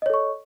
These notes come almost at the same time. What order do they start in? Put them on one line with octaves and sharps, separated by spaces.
D#5 C#5 A4 C#6